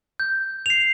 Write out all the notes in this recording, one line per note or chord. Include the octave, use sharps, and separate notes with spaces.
G6
C7 F7